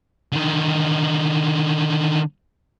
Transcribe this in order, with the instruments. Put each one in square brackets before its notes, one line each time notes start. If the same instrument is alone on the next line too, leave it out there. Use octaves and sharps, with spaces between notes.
[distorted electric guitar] D3 D#3